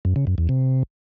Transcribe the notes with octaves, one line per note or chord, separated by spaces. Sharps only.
F#2
C#3
F#2
E2
C3